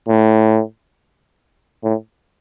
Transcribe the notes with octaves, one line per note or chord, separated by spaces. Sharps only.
A2
A2